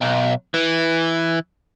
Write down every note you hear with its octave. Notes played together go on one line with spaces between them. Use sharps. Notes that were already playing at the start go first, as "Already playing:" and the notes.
B1
E3